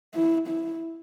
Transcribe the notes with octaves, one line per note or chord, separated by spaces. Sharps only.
E4
E4